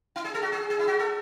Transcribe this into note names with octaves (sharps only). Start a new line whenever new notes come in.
E4
G#4
A4
F#4
G#4
G#4
E4
F#4
A4